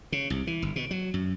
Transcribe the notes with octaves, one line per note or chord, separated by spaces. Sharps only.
C#3
C2
E3
G1
B2
F#3
F#2